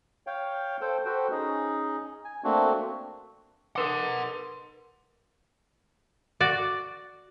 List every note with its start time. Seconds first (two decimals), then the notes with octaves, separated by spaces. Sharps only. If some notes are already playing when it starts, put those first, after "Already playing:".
0.27 C#5 F5 G5
0.81 A4 C5 G5
1.05 F#4 A4 B4 C5 G5
1.32 C#4 D#4 G#4 D#5
2.25 G#5
2.44 A3 A#3 C4 D4 F#4
3.76 A#4 B4 F#5 C6 D6
6.40 F#4 D5